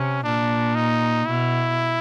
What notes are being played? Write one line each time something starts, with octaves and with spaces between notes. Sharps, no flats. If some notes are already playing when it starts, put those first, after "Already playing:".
Already playing: C3 C#4
A#2 D4
D#4
B2 E4